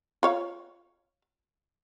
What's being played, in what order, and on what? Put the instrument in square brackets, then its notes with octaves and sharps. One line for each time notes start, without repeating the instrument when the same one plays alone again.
[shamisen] F4 C#5 F5